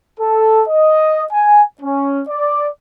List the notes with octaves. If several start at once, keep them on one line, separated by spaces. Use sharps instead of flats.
A4
D#5
G#5
C#4
D5